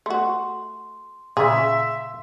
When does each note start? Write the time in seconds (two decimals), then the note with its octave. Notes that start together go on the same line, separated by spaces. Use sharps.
0.06 A3 F#4 C6
1.37 A#2 C#3 G#4 E5 F5 C6